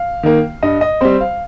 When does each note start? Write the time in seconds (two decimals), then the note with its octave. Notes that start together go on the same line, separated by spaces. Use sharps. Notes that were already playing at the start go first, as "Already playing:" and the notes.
Already playing: F5
0.23 D#3 A#3
0.63 G2 D#5
0.81 D#5
1.01 G3 C4 C5
1.21 F5